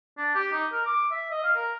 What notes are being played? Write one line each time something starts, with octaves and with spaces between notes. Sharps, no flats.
D4
G4
D#4
A#4
D6
E5
D#5
F5
A#4